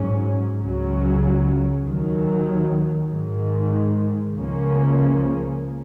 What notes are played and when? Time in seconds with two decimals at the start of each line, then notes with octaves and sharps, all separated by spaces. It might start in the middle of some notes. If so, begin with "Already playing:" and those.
Already playing: G#2 F#3 C#4
0.60 C#2 C#3 F#3 C#4
1.85 D#2 D#3 F#3
3.09 G#2 D#3 G#3
4.34 C#2 C#3 F3 A#3 C#4